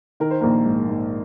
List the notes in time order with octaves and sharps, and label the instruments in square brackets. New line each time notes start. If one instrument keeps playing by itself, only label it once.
[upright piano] D#3 A#4
C5
A#1 A#3 A#4
G#2
G#2